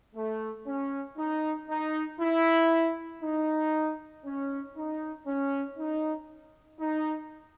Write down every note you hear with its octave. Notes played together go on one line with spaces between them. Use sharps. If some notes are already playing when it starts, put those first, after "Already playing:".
A3
C#4
D#4
D#4
E4
D#4
C#4
D#4
C#4
D#4
D#4